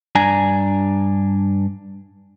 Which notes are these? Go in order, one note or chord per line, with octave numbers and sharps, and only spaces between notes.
G2 D4 G#5 A#5